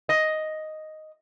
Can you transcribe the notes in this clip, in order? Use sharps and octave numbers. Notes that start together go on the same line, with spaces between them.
D#5